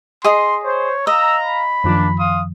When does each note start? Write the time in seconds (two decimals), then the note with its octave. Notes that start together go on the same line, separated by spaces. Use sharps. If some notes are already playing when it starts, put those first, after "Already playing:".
0.24 G#4 D#5 C6 D#6
0.64 C5 C#5
1.07 D#5 F5 A#5 E6
1.43 B5
1.84 F#2 D#3 F3 A#3 D4
2.17 F5 C6 D#6